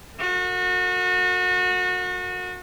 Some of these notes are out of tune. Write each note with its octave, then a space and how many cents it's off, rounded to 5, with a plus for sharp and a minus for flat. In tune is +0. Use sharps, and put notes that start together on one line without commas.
F#4 -30 A#4 -40